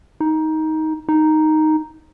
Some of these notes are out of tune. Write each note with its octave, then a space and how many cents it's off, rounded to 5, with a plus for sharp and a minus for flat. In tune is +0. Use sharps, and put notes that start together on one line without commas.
D#4 +15
D#4 +0